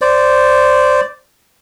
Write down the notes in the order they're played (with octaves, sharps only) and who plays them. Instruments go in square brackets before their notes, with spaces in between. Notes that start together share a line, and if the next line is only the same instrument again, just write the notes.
[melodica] C5 D5